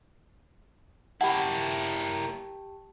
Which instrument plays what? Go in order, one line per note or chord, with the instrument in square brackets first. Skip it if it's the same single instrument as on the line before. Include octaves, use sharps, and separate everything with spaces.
[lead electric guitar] A#3 E4 [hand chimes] G4 G5 A5 [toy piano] F#5 B5